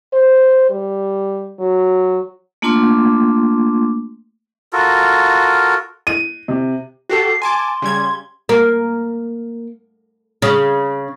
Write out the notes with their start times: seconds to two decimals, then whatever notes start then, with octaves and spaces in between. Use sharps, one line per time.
0.13 C5
0.70 G3
1.59 F#3
2.62 A3 A#3 D4 F4 C6 D6
4.73 F4 F#4 A4 A#4
6.07 D#7
6.48 C3
7.09 F#4 G4 A4 C7
7.42 G#5 A5 C6 D6
7.82 C#3 G3 G#6
8.49 A#3
10.42 C#3